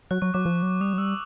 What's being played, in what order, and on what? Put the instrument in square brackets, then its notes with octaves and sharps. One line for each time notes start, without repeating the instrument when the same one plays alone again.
[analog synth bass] F#3 [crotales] F#6
[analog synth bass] F#3 [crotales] C#6
[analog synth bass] F#3 [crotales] D6
[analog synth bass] F3
F#3
[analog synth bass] G3 [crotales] D#6
[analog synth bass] F#3
[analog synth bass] G3 [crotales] E6